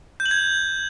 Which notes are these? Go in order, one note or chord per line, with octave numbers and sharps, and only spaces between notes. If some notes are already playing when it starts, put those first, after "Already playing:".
G6
F#7
G#6